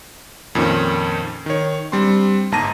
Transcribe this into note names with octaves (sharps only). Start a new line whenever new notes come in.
F2 A#2 D#3 C#4
D#3 C#5
G3 C4 D4 C6
G1 G#2 A5 A#5 A#6 D#7